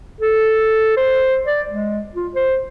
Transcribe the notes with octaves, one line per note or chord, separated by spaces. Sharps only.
A4
C5
D5
G#3
F4
C5